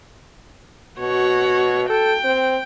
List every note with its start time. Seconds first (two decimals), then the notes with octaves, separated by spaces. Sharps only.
1.00 B2 F#4 C#5
1.90 A4 G5
2.24 C4